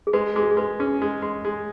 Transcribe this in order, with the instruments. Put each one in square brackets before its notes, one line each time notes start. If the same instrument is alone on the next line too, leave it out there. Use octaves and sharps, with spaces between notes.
[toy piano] G#4
[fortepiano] G#3 [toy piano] B4
[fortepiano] G#3 [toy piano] G#4
[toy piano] F#4
G#4
[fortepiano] G#3 [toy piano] B4
[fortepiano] C#4 [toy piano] G#4
[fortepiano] G#3
G#3
G#3